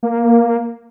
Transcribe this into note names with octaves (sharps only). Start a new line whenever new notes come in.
A#3